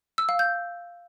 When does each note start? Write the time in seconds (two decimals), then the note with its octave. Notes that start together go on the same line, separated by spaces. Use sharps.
0.18 E6
0.29 F5
0.39 G6